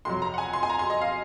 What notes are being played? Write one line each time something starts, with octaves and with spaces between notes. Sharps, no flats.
F2 C3 F#3 C6
A#5
F#5
G#5
C6
G#5
A#5
C6
D#5
F5